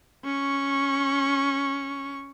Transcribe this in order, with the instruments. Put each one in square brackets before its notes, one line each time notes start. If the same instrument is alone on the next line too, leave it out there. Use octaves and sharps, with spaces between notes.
[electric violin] C#4 C#6